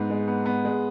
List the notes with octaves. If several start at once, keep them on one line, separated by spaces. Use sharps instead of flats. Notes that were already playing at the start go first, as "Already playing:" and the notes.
Already playing: G#2 B3
G#3
B3
B3
G#3